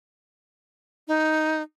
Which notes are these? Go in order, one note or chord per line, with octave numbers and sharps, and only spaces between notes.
D#4